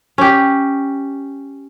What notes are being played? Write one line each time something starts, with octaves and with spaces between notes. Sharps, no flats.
C#4 G4